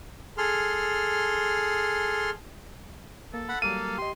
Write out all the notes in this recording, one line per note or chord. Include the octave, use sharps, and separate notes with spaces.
G#4 A4 C6 F6
A#3 A4
F#5 B5
F#3 G3 A#3 F5 E6 D#7
G4 D#5 C6